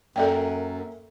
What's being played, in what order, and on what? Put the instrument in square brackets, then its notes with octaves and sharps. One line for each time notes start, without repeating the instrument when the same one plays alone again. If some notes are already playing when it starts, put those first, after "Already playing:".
[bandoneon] F#2 [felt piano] A#3 E5 [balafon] A4 D5 G5